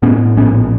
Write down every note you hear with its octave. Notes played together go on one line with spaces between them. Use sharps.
A2 B3 C#4
A#1 B3 C#4